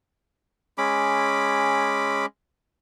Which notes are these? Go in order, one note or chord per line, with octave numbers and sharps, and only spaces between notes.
G#3 C#4 B5 D6